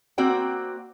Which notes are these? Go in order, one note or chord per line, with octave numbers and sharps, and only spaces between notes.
A#3 C4 F#4 D5 G5